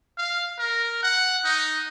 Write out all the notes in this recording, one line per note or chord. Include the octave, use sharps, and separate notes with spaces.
F5
A#4
F#5
D#4